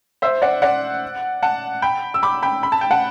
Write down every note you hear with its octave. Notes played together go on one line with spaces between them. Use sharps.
C5 E5
D5 F#5
D5 F#5
F#5 A5
G5 B5
E6
B5 D6
G5 B5
B5
A5
G5
F#5 A5